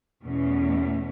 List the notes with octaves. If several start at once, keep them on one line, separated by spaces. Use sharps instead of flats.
E2 B2 A3 C#4